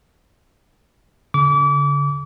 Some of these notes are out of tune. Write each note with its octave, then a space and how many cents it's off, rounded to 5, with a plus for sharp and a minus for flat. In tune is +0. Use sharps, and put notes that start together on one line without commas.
D3 -45 D6 -35